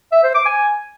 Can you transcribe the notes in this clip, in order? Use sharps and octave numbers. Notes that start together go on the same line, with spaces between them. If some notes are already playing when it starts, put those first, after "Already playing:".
E5
C5
D6
G#5